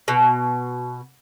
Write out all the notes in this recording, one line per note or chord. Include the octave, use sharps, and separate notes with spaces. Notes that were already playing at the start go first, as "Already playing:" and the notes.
B2